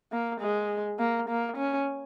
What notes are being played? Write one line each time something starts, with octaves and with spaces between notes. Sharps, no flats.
A#3
G#3
A#3
A#3
C#4